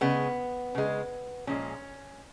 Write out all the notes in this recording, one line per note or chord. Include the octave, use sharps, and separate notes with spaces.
C#3 G#3 B3
C#3 G#3
A#2 F3 G#3 C#4